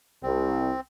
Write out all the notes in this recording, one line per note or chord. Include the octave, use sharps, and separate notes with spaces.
C2 C4